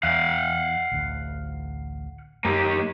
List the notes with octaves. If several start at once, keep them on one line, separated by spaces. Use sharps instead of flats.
E2 F5 F#5
A1 D2
F#2 A#3 G4